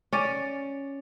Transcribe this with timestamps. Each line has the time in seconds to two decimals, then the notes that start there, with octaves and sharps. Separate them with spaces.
0.13 C#4 D5